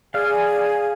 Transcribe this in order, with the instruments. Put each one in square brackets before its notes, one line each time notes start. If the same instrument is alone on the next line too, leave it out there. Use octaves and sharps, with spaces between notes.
[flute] G#4 [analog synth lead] D5 [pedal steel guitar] F5 F6 [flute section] G#5